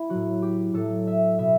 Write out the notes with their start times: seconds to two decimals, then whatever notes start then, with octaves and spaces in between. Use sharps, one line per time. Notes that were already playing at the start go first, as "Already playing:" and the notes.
Already playing: E4
0.10 A2 F#3 F#4
0.42 G4
0.74 A2 F#3 A4
1.07 E5
1.39 B2 E5